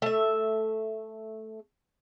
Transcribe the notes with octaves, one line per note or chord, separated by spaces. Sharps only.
A3 E5